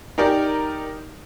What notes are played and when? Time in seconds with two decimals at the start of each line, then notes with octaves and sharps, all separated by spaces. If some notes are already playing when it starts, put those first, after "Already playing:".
0.18 D#4 G4 A#4 D5